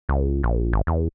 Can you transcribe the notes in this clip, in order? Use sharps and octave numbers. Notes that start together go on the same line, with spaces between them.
C#2
A#1
G#1
E2